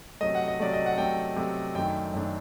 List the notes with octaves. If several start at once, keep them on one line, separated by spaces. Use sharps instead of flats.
C3 F#3 A3 D#5
F#5
D#5
C3 F#3 A3 D5
D#5
F#5
C3 F#3 A3 G5
C3 F#3 A3
F#2 D#3 A3 D4 G5
F#2 D#3 A3 D4